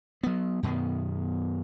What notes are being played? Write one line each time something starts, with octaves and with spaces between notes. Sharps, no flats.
F#3 B3
F#2 B2 D#3 B3